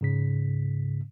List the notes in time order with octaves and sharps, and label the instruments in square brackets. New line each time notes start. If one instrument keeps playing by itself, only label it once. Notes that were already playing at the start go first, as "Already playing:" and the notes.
[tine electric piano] G#2 C#3 B6